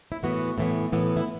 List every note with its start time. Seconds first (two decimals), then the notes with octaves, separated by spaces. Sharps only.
0.12 E4
0.23 A2 E3 B3 F#4
0.58 A2 E3 B3
0.92 A2 E3 B3
1.17 E4